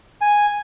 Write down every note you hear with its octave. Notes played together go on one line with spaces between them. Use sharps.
G#5